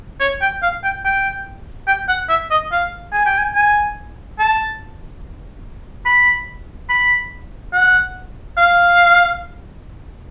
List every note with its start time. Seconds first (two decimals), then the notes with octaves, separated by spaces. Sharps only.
0.20 C#5
0.42 G5
0.62 F5
0.84 G5
1.05 G5
1.87 G5
2.08 F#5
2.29 E5
2.50 D#5
2.72 F5
3.13 G#5
3.26 G5
3.38 G#5
3.55 G#5
4.39 A5
6.05 B5
6.89 B5
7.73 F#5
8.57 F5